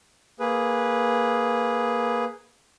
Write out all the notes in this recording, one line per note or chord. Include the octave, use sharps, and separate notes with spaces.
A#3 G#4 B4